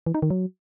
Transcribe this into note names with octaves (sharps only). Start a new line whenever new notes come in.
E3
D#4
D#3
F#3